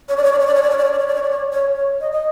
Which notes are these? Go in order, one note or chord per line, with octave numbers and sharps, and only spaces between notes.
C#5
D5
C#5
D5
C#5
D5
C#5
D5
C#5
D5
C#5
D5
C#5
D5
C#5
D5
C#5
C#5
C#5
D#5
D#5